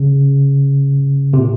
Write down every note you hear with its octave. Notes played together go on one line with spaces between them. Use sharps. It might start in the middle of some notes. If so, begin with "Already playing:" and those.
Already playing: C#3
C3
A#2